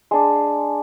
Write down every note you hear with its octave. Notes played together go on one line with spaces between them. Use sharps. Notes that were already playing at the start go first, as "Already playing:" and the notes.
G#3 D4